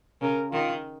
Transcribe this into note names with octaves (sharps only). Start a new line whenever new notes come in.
C#3 A#4
D#3 F4